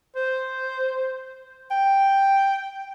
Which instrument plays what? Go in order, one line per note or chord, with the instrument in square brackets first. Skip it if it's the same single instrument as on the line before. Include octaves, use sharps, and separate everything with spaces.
[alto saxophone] C5
G5